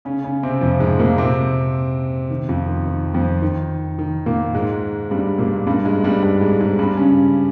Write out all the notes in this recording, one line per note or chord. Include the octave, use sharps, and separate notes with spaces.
C#3 C#4
C#3 C#4
C3 C4
F2 F3
G#2 G#3
A#2 A#3
C3 C4
D#3
F2 F3
D#3
D#3
F2 F3
D#3
D#3
A#2 A#3
G#2 G#3
G2 G3
A#2 A#3
G2 G3
G#2 G#3
G2 G3
G2 G3
G#2 G#3
G#2 G#3
G2 G3
C#3 C#4